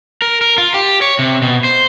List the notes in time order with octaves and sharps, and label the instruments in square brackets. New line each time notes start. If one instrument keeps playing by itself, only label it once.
[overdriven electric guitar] A#4
A#4
F4
G4
C#5
C3
B2
C5